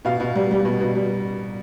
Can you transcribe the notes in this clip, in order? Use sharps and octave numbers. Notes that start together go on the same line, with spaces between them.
B2 F5
B2
G3
G3
B2
B2
G3